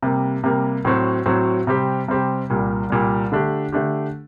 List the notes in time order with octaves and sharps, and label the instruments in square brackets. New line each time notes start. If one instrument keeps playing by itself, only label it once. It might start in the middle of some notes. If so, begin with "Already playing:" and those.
[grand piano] C3 G3 A#3
C3 G3 A#3
A2 F#3 C4 F#4
A2 F#3 C4 F#4
C3 G3 C4 G4
C3 G3 C4 G4
C2 A#2 G3
C2 A#2 G3
D3 A3 D4 G4
D3 A3 D4 G4